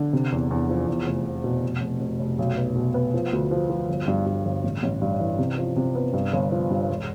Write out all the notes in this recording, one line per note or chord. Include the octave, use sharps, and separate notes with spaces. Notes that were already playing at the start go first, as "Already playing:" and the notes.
Already playing: D3
C3
E2
E2
F3
E2
F1
F1
B2
F1
F1
F1
F1
B1
B3
B2
B3
F3
D2
F3
F3
G1
G2
G2
G1
A1
A1
G2
E3
C3
F3
C3
B3
G2
G1
F3
G2
E1